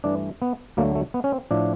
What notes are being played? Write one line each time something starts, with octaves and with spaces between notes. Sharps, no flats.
G2 E3 A3 D4
B3
D2 D3 F#3 A3 A#3
A3
B3
C#4
C4
A2 F3 A3 D4